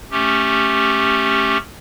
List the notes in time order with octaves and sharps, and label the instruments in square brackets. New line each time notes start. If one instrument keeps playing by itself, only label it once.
[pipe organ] A3 C#4 G4